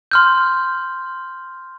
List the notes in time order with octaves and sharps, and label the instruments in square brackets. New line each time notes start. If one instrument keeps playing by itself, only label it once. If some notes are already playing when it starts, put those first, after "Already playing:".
[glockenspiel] C6 F6 G6